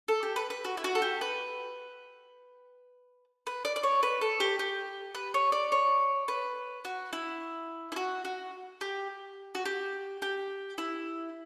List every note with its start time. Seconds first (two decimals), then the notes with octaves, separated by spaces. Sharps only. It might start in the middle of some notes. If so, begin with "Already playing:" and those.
0.08 A4
0.23 G4
0.36 B4
0.50 B4
0.64 F#4
0.77 E4
0.84 F#4
0.95 A4
1.02 G4
1.21 B4
3.47 B4
3.65 D5
3.76 D5
3.83 C#5
4.03 B4
4.21 A4
4.40 G4
4.59 G4
5.15 B4
5.34 C#5
5.52 D5
5.72 C#5
6.28 B4
6.85 F#4
7.13 E4
7.92 E4
7.96 F#4
8.25 F#4
8.81 G4
9.55 F#4
9.65 G4
10.22 G4
10.78 E4